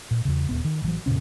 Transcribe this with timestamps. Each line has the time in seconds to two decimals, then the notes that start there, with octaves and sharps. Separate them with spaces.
0.11 A#2
0.25 E2 C#3
0.49 D#1 G2 B3
0.65 D#3
0.82 A1 E3 F#3
1.06 F2 A#2 C#3 C#4